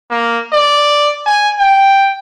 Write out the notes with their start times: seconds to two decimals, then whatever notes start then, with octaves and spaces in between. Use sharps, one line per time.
0.11 A#3
0.52 D5
1.26 G#5
1.59 G5